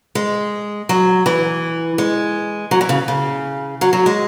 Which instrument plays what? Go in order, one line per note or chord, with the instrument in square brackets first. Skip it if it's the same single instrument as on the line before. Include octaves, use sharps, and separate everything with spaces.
[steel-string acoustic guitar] G#3
F#3
E3
G#3
F#3
E3
C#3
C#3
F#3
F#3
G#3